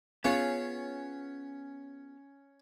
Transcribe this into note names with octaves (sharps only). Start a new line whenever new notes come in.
B3 C#4 F4 G#4 C#5